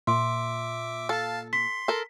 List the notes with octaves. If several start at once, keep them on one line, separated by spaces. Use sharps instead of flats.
A#2 E5 C6 D6
A4 F5 A5
C6 B6
A4 A#4